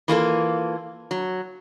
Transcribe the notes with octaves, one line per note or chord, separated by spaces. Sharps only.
E3 A#3 F4 A4
F#3